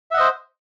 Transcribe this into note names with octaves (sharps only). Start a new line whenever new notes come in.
C5 D#5 E5 F#5